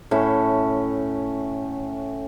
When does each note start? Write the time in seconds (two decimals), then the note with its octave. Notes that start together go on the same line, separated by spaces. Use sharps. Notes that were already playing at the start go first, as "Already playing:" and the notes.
0.11 A2 C#4 E5